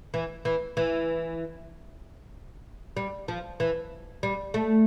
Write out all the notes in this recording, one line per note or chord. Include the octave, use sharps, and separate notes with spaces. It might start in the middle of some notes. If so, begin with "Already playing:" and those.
E3
E3
E3
G3
F3
E3
G3
A3